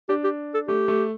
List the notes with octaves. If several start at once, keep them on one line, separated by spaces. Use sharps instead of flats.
D4 G4
G4
A4
A3 G4
A3